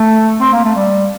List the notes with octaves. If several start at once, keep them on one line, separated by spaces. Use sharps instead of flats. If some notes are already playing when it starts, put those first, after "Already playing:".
Already playing: A3
C4
A#3
A3
G3